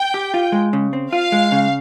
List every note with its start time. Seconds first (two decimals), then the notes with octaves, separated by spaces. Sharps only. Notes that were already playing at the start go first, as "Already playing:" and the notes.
Already playing: G5
0.14 G4
0.34 F4
0.52 G#3
0.73 C#3
0.93 C4
1.12 F4 F5
1.32 G#3
1.52 C#3